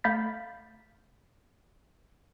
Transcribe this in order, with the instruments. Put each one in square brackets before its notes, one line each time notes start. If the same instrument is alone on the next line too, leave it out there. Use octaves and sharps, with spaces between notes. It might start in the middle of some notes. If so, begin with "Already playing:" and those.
[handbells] A3 F5 B5 G6 A6 B6